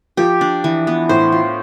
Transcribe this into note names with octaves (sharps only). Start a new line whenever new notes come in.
F3 G4
D4
E3
B3
A2 C5
F4